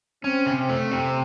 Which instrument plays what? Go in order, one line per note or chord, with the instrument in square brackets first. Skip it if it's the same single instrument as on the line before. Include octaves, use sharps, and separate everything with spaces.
[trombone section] C4 [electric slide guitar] C#4
[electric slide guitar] C3
A3
C3